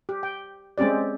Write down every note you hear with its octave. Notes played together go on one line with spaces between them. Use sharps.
G4
G5
G#3 C4 C#4 G4 D5